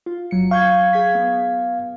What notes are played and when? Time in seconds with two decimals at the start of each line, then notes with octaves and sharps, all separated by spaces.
0.06 F4
0.31 G1 F#3 C#7
0.51 F5 C#6 G6 G#6
0.93 G#4 G#6 B6
1.15 B3